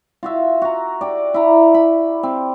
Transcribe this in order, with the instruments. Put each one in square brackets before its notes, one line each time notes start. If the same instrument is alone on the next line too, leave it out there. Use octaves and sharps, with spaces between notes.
[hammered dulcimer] F4 F#4 E5
F#4 A#5
G4 D5
E4 A#5
B5
C4